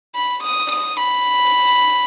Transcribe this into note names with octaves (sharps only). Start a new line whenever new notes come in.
B5
D#6
D#6
B5